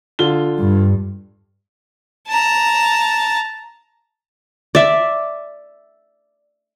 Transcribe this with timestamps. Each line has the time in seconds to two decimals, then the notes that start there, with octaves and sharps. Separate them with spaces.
0.19 D3 F4 G7
0.60 G2
2.28 A5 A#5
4.75 D5 E5